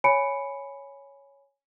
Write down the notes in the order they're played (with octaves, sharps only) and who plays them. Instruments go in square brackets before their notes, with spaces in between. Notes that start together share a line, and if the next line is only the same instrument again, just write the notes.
[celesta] C#5 G#5 B5 C#7 D7